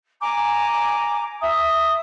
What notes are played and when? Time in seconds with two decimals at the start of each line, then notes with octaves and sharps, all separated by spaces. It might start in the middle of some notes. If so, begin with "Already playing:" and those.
0.21 G#5 A#5 D6
1.40 E5 D#6